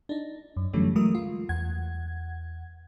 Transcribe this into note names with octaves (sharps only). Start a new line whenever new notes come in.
D4 D#4
F#2
D3 E3 F#3 G3 A3 C#4
E3 F#3 G#3 A3 A#4 D#6
F4
E2 F#5 G#6